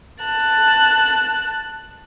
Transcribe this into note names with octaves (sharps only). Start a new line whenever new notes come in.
A5 F#6